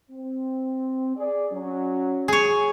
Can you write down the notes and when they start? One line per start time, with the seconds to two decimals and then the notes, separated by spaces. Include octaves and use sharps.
0.11 C4
1.17 G#4 D5
1.52 F#3 C#4
2.28 G#4 C#5